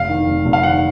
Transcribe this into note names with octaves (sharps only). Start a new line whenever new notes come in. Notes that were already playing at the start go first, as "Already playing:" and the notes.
Already playing: F1 F5
D#3
F1
F1
F5
D#3 F#5